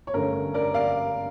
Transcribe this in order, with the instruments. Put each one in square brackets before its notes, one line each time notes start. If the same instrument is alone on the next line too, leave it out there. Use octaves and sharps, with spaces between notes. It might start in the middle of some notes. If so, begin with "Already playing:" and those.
[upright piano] C#5
G2 D3 A3 C#4 A#4
A#4 D5
D5 F5